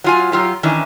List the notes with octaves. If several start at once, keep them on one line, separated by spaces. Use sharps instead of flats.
F#3 F4 G#5
F#3 F4 G4
D#3 E3 C#4 D4